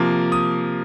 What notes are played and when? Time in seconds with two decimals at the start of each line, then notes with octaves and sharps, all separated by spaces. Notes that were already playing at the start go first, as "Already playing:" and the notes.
Already playing: C3 F3 A#3
0.32 D#6